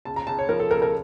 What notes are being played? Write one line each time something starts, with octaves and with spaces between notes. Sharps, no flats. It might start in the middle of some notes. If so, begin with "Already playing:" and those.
C#2 A5
A#5
C#2 A5
C#5
F3 A#4
A4
C#2 A#4
A#4